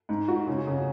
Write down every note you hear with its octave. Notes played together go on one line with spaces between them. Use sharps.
G#2
F#4
C#3
C#3